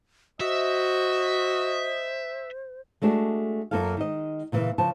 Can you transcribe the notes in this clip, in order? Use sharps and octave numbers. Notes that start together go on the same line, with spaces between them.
F#4 C5 D#5 E5
G#3 A3 D4 F#4 G#4
F#2 A#3 F4 A4 F5
D#3 G#3 D#5
A#2 C#3 E3 A3 A#3
C#3 F3 A5